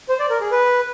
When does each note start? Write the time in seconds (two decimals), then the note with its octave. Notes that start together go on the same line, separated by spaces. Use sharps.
0.09 C5
0.20 D5
0.30 A#4
0.41 G#4
0.51 B4